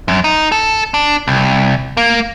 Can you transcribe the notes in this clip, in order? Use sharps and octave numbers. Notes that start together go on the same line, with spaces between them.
F#2
D#4
A4
D4
C2
A#3